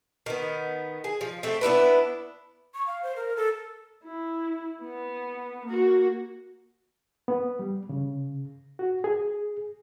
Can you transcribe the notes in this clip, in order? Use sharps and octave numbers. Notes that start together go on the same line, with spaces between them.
D#3 B3
G#4
F3
A3 C4
B3 D4 E4 B4
C#6
F5
C5
A#4
A4
E4
B3
A#3 F#4
B3
G3
C#3
F#4
G#4